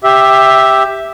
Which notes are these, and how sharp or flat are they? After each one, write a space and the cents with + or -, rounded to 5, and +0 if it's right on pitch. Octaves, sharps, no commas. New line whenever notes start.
G4 +5 E5 +0